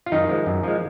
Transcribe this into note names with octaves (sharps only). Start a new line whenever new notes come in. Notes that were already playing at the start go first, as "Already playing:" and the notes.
F4
F#2 D#3 D#4
F3 G#3
F#2
F3 G#3